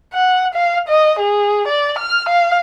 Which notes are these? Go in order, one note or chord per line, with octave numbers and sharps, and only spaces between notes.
F#5
F5
D#5
G#4
D5
F6
F5